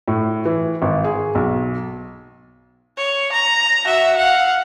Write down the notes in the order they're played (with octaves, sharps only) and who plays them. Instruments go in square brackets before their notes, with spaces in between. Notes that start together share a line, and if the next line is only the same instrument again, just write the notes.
[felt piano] A2
E3
G#1
G#4
B1
[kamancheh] C#5
A#5
F#4 E5
F5 F#5